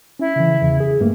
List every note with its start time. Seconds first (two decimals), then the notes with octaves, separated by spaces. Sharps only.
0.19 C#4 E4
0.36 C#3 E3
0.62 E2 C#3
0.80 G#4
1.01 G2 A3 A#3